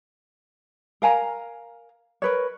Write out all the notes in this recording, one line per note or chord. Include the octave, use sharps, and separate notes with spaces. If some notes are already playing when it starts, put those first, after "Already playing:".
A#4 F5 G#5 A#5
A#4 B4 C#5